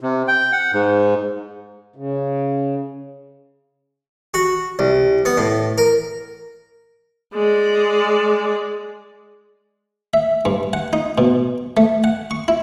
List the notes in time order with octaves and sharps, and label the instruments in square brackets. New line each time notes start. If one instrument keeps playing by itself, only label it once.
[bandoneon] C3
G5
F#5
G#2
[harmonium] C#3
[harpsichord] F#4
C2
B3
A2
A#4
[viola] G#3 D5
[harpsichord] E5
G2
F#5
D#4
B2
A3
F#5
C#6
E4